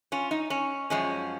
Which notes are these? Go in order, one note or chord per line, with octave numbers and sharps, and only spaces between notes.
C#4 F4
D#4
C#4
F#2 F3 G#3 C#4